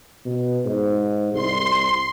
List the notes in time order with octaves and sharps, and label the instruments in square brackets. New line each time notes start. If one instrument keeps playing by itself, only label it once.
[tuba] B2
G#2
[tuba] C2 [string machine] C6